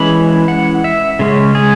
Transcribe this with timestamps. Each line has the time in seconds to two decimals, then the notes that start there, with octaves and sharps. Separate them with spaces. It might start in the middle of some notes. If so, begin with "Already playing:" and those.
Already playing: E3 G#3 C#4 B5
0.48 F#5
0.84 E5
1.19 C#3 G#3 C#4
1.55 G#4